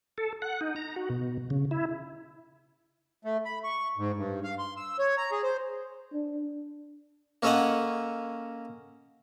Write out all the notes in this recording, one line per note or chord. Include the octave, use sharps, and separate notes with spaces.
A4
F#5
D#4
A#5
F#4
B2
C#3
E4
A3
B5
C#6
G#2
G2
F5
C6
E6
C#5
A#5
G#4
C5
D4
A#3 C#4 A4 C#5 D#5 F#5